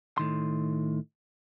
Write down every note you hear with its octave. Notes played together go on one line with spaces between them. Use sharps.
A2 D#3 C6